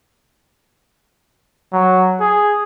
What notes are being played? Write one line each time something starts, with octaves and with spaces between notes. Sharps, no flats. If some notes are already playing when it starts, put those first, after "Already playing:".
F#3
G#4